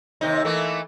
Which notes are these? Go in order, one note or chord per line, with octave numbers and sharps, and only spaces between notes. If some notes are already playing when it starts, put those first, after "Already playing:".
D#2 C3 D#4
E3 A3 A#3